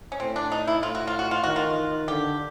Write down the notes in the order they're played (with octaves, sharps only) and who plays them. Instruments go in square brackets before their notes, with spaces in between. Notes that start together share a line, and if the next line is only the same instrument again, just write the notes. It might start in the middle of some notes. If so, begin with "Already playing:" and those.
[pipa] C#4
[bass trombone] A2 [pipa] C4
[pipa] D4
D#4
E4
[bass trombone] A2 [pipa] F4
[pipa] F#4
F4
F#4
F4
[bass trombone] D#3 [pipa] F#4
[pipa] F4
[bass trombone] D#3
[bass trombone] D3 [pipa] G4